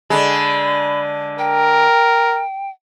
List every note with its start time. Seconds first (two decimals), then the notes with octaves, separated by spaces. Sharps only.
0.10 D3 G#3 B5
1.39 A#4 G5